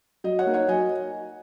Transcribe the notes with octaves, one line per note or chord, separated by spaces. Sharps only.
F#3 D#5
C#5 F#5
A#3 D#4
C#5 F#5
F#3 D#5 G#5